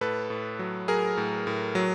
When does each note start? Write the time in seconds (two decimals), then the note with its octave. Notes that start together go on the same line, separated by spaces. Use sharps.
0.01 A2 A4 B4
0.30 A2
0.59 F#3
0.88 F#3 G#4 A#4
1.17 A2
1.47 A2
1.75 F#3